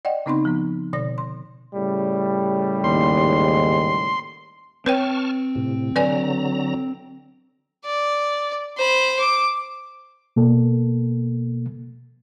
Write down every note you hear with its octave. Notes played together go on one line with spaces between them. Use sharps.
D5 D#5 F#5 G5
C#3 B3 C4 D#4 B5 C6
F3 B3
B2 D3 D5 A#6
C6
A2 C#3 G3
D#2 G#2 C6
C4 B4 C#5 G5 A5 C#6 F6
A2 C3
D3 F#3 B4 D5 G#5 A#5
D5
C5 B5
D6
B2 A#3 A4